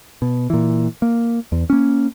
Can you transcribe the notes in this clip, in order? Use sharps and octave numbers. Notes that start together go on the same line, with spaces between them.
B2
A#2 E3
A#3
E2
A#3 C#4